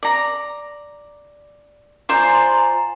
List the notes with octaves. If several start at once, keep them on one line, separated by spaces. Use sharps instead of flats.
D5 A#5
F4 C5 D5 G#5 A#5